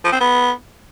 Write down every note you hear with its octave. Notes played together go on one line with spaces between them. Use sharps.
F3
C4
B3